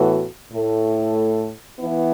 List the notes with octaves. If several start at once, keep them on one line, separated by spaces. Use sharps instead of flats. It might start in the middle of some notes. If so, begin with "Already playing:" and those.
Already playing: A2 E3 B3 F#4 A4
A2 A3 E4 A4
E3 B3 E4